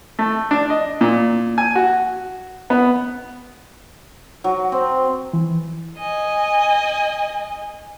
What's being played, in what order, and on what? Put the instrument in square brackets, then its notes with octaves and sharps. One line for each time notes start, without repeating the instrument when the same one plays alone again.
[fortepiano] A3
D4
D#5
A#2
G#5
F#4
B3
[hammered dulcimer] F#3
C4
[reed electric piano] E3
[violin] D#5 G#5